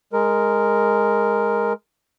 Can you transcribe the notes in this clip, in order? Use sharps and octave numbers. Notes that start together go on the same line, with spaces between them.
G#3 A#4